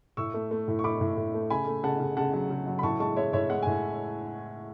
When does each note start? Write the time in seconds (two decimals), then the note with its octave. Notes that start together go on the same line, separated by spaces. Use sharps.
0.17 A2 C#6 E6
0.34 A3
0.51 A3
0.68 A2
0.79 C#6
0.84 A2 B5 D6
1.01 A2
1.17 A2
1.34 A3
1.50 C#3 G#5 B5
1.67 A3
1.83 C#3 F#5 A5
2.00 C#3
2.17 C#3 F#5 A5
2.33 F#3
2.50 C#3
2.67 F#3
2.79 B5
2.83 A2 A5 C#6
3.00 G#3 A5 C#6
3.16 G#3 C#5 E5
3.33 A2 C#5 E5
3.50 G#3 F#5
3.63 A2 G#5